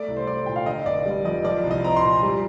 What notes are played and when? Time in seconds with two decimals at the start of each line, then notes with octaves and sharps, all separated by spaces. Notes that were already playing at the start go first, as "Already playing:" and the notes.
Already playing: A3 D5
0.08 C2
0.17 C5
0.27 C2 D5
0.46 A#2 G5
0.56 F5
0.66 D3 D#5
0.86 F1 D5
1.06 G3
1.25 F2 D#5
1.44 F3 D5
1.64 C2
1.71 D#5
1.84 C4 A#5
1.96 C6
2.03 A#2
2.23 G3